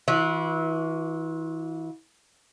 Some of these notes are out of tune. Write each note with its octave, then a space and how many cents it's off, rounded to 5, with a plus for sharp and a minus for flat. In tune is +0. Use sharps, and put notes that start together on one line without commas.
E3 -25 F4 +40